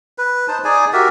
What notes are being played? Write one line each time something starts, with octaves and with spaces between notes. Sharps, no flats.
B4
D#4 C5 A5
D#4 G#4 D5 G#5
F#4 G4 A#4 E5